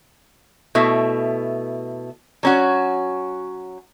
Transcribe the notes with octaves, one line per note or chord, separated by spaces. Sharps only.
B2 A3 E4
F#3 C#4 F#4